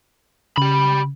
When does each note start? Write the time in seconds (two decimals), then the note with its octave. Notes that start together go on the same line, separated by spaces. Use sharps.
0.58 C#3 G4 B5